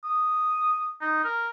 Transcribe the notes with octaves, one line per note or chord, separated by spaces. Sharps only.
D#6
D#4
A#4